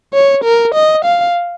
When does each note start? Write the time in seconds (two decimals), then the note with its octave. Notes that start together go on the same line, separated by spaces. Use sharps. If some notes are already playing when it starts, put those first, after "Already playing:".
0.14 C#5
0.44 A#4
0.74 D#5
1.05 F5